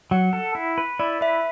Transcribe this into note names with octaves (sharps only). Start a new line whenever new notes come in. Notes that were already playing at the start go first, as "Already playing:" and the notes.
F#3 F#5
A4
E4
B4
E4 D5
B4 E5